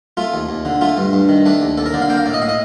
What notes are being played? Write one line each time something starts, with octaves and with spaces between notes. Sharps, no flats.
A3 F4
D#2
D#2
D3
A3 F4
G2
G2
D#3
A3 D4
D#2
D#2 A4
A#4
D3 D5
F5
A#3 G5
F5
A2 D5
D#5
A2 F5
D#5